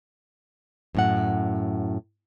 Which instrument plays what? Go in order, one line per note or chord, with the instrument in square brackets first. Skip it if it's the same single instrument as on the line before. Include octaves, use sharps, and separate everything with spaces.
[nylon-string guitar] F#2 A2 F#5